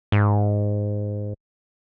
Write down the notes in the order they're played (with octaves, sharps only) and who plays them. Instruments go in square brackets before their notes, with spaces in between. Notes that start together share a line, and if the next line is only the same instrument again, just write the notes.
[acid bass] G#2